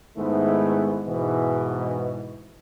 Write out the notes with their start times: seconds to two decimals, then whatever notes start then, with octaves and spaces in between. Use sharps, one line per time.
0.16 G#2 D#3 G#3 A3 B3 E4
1.06 G#2 B2 E3